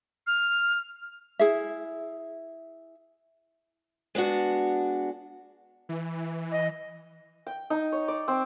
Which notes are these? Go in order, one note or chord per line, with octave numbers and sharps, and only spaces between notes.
F6
E4 G#4 E5
G#3 B3 D4 F#4
E3
D#5
G5
D#4
C#5
D5
C4